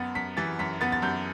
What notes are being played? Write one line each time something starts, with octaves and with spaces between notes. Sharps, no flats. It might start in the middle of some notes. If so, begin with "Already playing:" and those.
Already playing: F#2 B3 A6
F#2 B6
E3 A6
F#2 B6
B3 A6
A6
F#2 G6